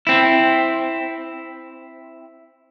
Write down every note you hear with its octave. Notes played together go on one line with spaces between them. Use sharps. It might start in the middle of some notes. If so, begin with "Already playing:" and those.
C4 E4